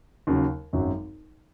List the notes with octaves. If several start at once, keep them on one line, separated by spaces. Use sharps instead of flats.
D#2 C#3 F#3
G#1 F#2 F#3